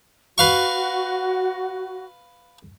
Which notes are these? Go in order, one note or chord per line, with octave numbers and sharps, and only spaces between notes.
F#4 B4 F5 C#6